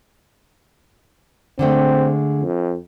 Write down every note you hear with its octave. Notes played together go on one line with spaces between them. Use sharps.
D3 G#3 A3 C4
F2